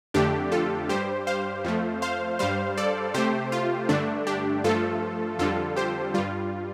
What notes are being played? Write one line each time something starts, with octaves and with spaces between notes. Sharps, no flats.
F2 D3 A3 D4 G4
F4 A4
G2 G3 G4 C5
C5 F5
F2 F3 A3
C5 F5
G2 G3 C5 F5
A4 D5
C3 A3 G4 C5
F4
G2 D3 A3 D4
D4 G4
G2 F3 A3 F4 A4
F2 D3 G3 F4 A4
G4 C5
G2 G3 F4